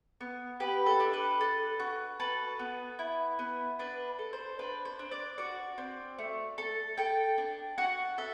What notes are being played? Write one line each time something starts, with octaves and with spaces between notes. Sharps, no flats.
B3
G4 B4
A4
D4
B4
A4
F#4
A4 B4
B3
E4
B3
D4 B4
A4
C5
D4 B4
C5
D4
D5
F#4 D5
C4
A3
A4
A4 G5
D4
F#4 F#5
A4 E5